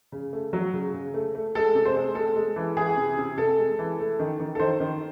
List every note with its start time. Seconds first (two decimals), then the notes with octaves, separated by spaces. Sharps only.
0.12 C#3
0.33 A3
0.53 F#3
0.73 C#3
0.94 C#3
1.14 A3
1.35 A3
1.55 G#3 A4
1.75 C3
1.85 C5
1.95 G#3
2.15 G#3 A4
2.36 G#3
2.56 E3
2.77 E3 G#4
2.97 C3
3.18 C3
3.37 C3 A4
3.58 G#3
3.79 E3
3.99 A3
4.19 D#3
4.40 D#3
4.55 A4
4.60 D#3 C5
4.80 D#3